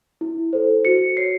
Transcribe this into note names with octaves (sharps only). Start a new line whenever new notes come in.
E4
A4 C5
F#4 C#7
C#5 C7